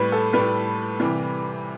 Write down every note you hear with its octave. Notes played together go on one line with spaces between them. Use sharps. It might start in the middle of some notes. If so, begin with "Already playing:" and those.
Already playing: A2 G3 B4
A4
A2 G3 B4
C2 C3 E3 G3